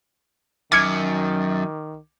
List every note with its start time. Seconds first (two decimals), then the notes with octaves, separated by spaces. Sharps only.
0.72 F#2 D#3 D6 F6 G#6 C#7